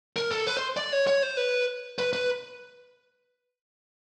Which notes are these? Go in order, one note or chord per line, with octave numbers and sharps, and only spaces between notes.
A#4
A4
B4
C5
D5
C#5
C#5
C5
B4
B4
B4